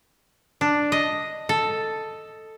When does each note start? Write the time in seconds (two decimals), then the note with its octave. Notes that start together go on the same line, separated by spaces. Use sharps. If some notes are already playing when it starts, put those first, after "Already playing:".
0.61 D4
0.92 D#5
1.49 A4